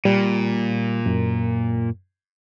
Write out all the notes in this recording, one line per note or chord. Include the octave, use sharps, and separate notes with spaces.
A#2 G3
F#2